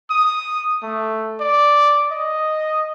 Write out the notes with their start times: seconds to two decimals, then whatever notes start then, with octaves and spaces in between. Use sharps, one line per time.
0.10 D#6
0.83 A3
1.40 D5
2.11 D#5